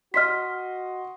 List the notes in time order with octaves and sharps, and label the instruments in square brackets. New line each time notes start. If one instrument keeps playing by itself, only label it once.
[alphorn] F#4 [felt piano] D#5 C6 [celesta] F6 B6